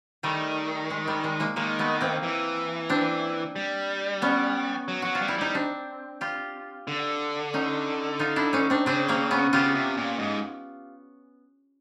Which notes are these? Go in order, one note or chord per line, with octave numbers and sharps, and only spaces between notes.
D#3 G3 A3
G#3
G3
G#3
G#3 A#3
D#3 G#3 A#3
A3 B3
A#3 C4
E3
C4 D4
G3
B3 C#4
F#3
F#3 F#4
F4
G3
E4
G3 D#4
C4 D4
F4 G4
D3
C#4 D#4
D#4 F4
D4 E4
C#4 D#4
C4 D4
C#3 C4 D4
A#3 C4
B3 C#4
C#3 F4 G4
C3
A#2
G#2